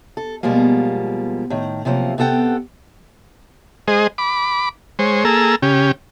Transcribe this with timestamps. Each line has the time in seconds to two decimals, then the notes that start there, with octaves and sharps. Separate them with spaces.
0.17 A4
0.43 B2 F3 G3 G#3 A#3
1.50 A2 D#3
1.85 C3 F3 F#3 A#3
2.18 C3 B3 A4 F#5 G5
3.88 G#3 G#4 C5 D#5
4.18 B5 D6
4.99 G#3 C5 C#5
5.25 A#3 G#4 A4 A#5 E6
5.62 C#3 C#4 G4